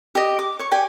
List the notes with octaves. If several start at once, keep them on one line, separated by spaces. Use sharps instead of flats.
G4 D#5
D6
C#5 C#6
G4 D5 G5 G#5